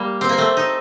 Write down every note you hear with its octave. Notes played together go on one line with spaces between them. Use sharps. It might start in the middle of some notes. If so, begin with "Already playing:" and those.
Already playing: G3 A#3
C4
A#3
A3 C4
D#4